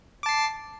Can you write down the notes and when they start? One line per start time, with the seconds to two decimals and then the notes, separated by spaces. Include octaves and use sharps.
0.23 D6
0.26 A5
0.29 C7